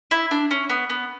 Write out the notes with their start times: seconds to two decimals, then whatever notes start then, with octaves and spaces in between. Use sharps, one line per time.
0.11 E4
0.31 D4
0.51 C#4
0.70 B3
0.90 B3